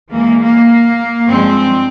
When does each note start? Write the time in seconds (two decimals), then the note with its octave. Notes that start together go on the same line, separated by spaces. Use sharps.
0.12 E2 E3 G#3 A#3
0.42 A#3
1.29 G2 F3 G#3 C4